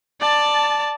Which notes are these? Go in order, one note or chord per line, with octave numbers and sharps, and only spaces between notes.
D5 A5